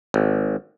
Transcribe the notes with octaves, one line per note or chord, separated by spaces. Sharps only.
G#1